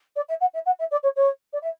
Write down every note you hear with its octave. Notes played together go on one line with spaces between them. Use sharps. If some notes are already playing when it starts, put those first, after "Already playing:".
D5
E5
F#5
E5
F#5
E5
D5
C#5
C#5
D5
E5